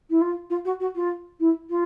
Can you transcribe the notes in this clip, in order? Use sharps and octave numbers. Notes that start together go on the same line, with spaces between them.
E4
F4
F4
F#4
F#4
F4
E4
F4